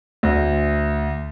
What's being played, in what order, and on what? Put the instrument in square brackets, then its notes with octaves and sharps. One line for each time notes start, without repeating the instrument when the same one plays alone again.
[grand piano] D2